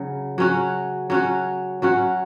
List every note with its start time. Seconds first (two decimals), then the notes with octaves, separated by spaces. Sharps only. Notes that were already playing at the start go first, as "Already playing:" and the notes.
Already playing: C#3 F#3
0.38 F#3 C#4 F#4
1.10 F#3 C#4 F#4
1.82 F#3 C#4 F#4